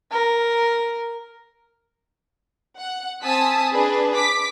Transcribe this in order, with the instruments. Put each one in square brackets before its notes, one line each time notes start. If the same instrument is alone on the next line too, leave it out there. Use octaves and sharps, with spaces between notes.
[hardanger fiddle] A#4
[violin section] F#5
C4 G#5 A5 D#6 E6 B6
D4 G#4 B4
D6 B6